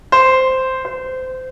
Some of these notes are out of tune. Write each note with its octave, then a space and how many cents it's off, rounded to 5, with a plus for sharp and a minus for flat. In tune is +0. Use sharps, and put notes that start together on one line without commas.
C5 -5
C5 -25